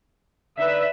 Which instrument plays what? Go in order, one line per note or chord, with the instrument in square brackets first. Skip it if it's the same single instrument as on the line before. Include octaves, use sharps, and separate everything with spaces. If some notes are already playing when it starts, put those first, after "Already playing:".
[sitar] D3 D#4 [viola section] B4 E5